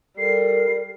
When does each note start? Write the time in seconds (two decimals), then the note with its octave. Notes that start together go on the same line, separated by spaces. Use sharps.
0.18 G3 A4 A#4 C7